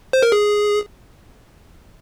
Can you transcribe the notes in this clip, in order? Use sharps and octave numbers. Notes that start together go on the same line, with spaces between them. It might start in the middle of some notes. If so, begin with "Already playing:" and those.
C5
A#4
G#4